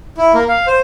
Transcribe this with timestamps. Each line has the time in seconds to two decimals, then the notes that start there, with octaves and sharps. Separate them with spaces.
0.18 E4
0.34 A#3
0.48 F5
0.67 C5